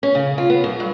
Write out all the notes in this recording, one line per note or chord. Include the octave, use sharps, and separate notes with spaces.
C#4
C#3
F4
B3
F#2
G2